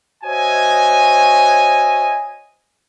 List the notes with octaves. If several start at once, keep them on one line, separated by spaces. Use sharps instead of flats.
F#4 C5 C#5 D#5 E5 G#5